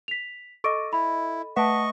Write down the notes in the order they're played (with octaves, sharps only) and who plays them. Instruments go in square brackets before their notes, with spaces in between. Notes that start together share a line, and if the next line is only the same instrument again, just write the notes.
[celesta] B6 F7
[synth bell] A4 D#5 [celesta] C#6 D6 D7
[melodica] E4 [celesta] B5
[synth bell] A3 B4 E5 [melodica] D#5 C#6 [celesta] F#5 A5